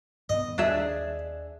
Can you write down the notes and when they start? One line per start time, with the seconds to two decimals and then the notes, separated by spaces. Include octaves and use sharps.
0.29 G2 D#3 B3 D#5
0.58 D#2 D4 G#4 E5